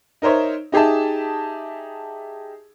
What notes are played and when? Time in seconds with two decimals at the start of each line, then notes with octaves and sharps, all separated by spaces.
0.22 D#4 A#4 C5 C#5 E5
0.72 D#4 G4 G#4 E5 A5